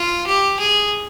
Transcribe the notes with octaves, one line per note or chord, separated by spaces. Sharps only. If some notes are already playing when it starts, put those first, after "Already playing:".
Already playing: F4
G4
G#4